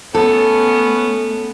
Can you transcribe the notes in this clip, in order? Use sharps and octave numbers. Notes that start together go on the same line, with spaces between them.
A3 B3 C#4 A4